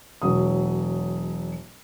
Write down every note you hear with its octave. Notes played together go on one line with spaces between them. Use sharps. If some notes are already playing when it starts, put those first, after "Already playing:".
E1 F#3 D#6